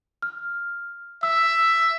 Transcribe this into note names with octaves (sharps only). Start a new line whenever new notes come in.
F6
E5 E6